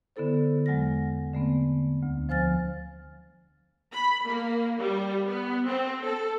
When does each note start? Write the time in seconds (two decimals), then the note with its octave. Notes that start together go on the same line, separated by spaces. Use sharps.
0.16 D3 B3 E4 A4 C5
0.66 E2 F#3 G#3 F#5 F6 A#6
1.33 D3 A3 B3 C4
2.03 D2
2.29 F3 C5 G#5 F6 A6
3.93 B5
4.27 A#3
4.79 G3
5.28 B3
5.66 C4
6.05 A4